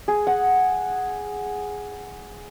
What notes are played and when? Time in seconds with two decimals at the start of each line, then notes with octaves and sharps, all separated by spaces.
0.08 G#4
0.27 F#5